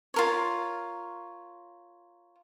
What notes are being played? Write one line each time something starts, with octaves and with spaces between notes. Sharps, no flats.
F4 A#4 C#5